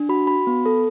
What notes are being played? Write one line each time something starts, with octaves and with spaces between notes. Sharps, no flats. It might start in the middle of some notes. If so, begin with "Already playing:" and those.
Already playing: D4
F#4 B5
F#4 B5
B3
A4